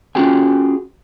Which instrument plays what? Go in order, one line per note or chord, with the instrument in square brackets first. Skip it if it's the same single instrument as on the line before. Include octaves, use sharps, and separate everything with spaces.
[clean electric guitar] C#4 F4 F#4 G#4 G5 G#5